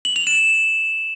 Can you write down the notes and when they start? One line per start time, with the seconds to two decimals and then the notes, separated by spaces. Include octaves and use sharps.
0.05 F#7
0.16 F7
0.27 E7